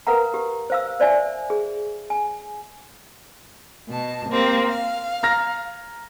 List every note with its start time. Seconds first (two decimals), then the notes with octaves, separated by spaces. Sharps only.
0.07 A#4 B4 F5 F#5 A#5
0.34 G4
0.70 C5 F5 E6
1.00 C5 D5 E5 G#5
1.50 G#4
2.10 G#5
3.90 B2 A5
4.30 A#3 C4 G4
4.65 F5
5.23 A#5 F6 A#6